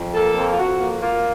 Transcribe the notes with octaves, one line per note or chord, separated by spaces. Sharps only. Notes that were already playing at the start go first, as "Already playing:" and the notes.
Already playing: F2
A#3 A4
F2
F4
F2 F#4
A#3
A#3 F4